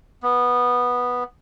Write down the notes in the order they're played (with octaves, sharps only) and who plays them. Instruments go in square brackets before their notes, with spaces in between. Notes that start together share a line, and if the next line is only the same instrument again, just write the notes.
[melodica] B3